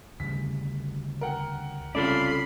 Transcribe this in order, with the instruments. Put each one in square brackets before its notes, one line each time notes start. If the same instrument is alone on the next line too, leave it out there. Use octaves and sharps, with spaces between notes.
[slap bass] D2 C#3 G3 [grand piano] B6
[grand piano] A#4 F#5 G5
[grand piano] C2 C#3 [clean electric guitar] F4 A4 D5 [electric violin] B5 C7